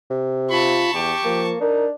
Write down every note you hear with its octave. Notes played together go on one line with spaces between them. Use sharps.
C3
F4 A5 B5 C#6
E2 G4
F3 A#3
D4 D#4 A#4